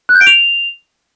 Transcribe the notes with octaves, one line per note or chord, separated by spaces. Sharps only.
F#6
G6
D7
F7